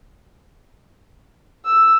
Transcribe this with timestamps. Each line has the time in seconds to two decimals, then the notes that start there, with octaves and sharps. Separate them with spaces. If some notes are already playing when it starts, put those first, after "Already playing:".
1.66 E6